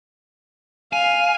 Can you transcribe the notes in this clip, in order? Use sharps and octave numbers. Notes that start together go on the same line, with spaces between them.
F5 G#5